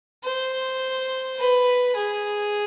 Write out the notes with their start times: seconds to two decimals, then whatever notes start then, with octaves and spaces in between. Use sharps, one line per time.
0.24 C5
1.38 B4
1.96 G#4